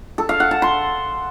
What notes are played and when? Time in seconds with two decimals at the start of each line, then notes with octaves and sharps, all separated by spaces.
0.18 A4
0.29 F5
0.40 F#5
0.51 A5
0.62 C6